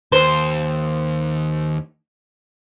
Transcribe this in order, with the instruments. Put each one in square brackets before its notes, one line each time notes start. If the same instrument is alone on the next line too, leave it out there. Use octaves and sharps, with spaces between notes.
[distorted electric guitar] D#2 [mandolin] C5